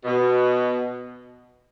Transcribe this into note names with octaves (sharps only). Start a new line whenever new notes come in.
B2